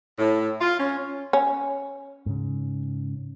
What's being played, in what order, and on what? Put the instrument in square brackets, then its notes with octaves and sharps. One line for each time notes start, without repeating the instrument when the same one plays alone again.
[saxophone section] A2
F4
C#4
[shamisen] C#4
[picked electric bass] G#2 C#3